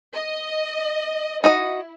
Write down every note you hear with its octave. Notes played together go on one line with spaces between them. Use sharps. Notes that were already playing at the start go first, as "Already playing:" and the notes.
D#5
D#4 E4 F#4 D#5